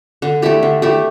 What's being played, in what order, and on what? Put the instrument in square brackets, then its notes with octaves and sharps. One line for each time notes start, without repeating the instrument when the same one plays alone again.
[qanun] D3
A3 E4 G4
D3
A3 E4 G4